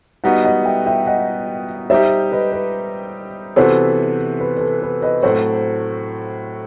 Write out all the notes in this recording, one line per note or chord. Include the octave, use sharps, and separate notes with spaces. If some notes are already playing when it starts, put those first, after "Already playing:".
G3 B3 D#4 F#4 D#5 F#5
D#5 F#5
E5 G5
E5 G5
D#5 F#5
G3 D#4 G4 C5 E5
B4 D#5
B4
C3 E3 B3 F#4 A4 C5
B4
B4
A4
B4
B4 D#5
A2 F#3 C4 F#4 A4 C5